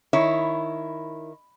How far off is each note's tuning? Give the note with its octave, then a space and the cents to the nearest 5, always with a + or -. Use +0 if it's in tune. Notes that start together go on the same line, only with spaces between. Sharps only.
D#3 +0 E4 +0 C#5 +0